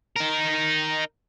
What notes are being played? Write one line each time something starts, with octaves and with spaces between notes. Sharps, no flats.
D#4 A#4